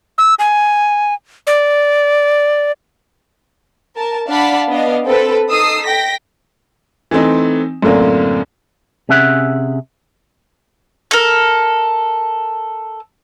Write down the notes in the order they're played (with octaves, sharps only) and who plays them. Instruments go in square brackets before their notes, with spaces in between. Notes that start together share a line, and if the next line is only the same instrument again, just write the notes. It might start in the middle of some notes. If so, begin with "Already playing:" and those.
[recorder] E6
G#5
D5
[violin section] A#4 A5
D4 F5 F#5 A5 B5
B3 D4 D#5 F5
C4 A4 B4
D#4 A4 D#6 E6 C7
G5 A#6 B6
[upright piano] E3 A3 C4 D#4
F#2 A2 D3 A#3 C4
[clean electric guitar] C3 C#4 G#4 E5 F#5
[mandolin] A4 A#4